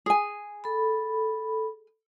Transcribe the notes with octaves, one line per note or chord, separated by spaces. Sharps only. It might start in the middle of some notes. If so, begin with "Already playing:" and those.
G#4 G#5
A4 B5